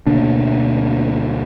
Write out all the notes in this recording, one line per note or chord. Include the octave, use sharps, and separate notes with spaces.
D2 B2 A#3 D4